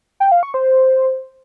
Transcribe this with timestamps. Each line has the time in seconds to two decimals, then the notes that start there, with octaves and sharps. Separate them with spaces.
0.20 G5
0.32 F5
0.43 C#6
0.54 C5